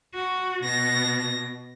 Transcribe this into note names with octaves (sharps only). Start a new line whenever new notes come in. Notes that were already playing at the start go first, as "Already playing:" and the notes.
F#4
B2 A#6